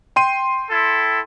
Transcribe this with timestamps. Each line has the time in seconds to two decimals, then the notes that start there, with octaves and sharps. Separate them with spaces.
0.16 G5 C6 D#7
0.70 E4 A4